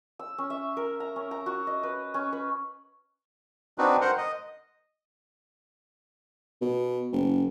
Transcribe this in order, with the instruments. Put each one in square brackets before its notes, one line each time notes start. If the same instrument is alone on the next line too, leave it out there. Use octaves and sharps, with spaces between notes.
[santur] E6
C#4
E5
A#4
A#5
C#4
A#5
F#4
D#5
B4
C#4
B4
[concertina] C4 D4 D#4 F#4 B4
A#4 C5 F#5
D#5
[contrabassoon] B2
F#1